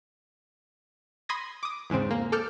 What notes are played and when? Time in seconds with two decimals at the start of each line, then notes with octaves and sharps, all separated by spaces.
1.29 B5 C6 D#6 G#6 A#6
1.63 D6 D#6
1.90 E2 G#2 C#3 C4
2.11 A#3
2.32 A4 D6 F6 G6